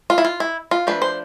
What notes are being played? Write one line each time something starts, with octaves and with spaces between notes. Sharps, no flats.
F4
E4
F4
E4
F4
F3 A3 D4 B4
C5